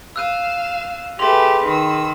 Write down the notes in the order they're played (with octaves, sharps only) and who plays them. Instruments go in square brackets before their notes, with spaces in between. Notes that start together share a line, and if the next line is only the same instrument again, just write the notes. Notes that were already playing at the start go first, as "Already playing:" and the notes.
[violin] F5 E7 [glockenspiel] E6 F#6 D#7
[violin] A3 A6 [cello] G4 B4 [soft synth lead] G#4 [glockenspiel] C6 F7
[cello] D#3 [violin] B4 E6